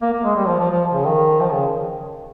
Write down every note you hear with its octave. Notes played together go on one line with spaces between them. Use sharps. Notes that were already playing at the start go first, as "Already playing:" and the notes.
A#3
A#3
G#3
G3
F3
F3
F3
C#3
D#3
F3
C#3